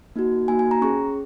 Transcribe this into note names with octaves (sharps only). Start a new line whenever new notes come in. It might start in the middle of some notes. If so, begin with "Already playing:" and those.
A#3 D#4 F#4
A#3 D#4 F#4 G#5
G#5
A#5
C#4 G#4 C#6